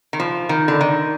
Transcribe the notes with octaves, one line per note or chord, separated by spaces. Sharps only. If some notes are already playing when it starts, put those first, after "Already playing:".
D#3
F3
D#3
D3
D#3